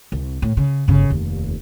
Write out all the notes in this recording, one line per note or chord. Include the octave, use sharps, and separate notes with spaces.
C2
A2
C#3
G1 C#3
F1 D#2